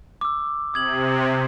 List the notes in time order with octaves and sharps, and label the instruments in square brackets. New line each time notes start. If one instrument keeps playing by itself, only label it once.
[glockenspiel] D6 E6
[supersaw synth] C3 [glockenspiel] D#6 G#6 F#7